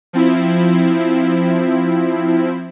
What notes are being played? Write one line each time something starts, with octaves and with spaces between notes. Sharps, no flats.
F3 C4 E4